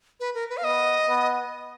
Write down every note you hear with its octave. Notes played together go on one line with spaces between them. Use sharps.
B4
A#4
B4
F5
B3 D#5
B3